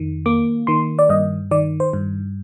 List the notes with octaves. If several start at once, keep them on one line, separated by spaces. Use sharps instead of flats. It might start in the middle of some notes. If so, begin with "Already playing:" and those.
Already playing: F2 D#3
A#3 D6
D#3 C6
D5
G2 D#5
D#3 D5
C5
G2